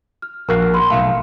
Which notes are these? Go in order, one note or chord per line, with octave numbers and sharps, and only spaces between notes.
F6
A#1 F#4 A#4 F5
B5 C6
B1 A3 F5